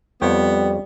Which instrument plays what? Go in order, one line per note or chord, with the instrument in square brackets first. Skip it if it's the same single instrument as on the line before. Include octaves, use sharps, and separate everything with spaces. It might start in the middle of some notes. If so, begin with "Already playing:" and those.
[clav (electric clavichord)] F2 C#5 G5 [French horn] G3 [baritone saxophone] B3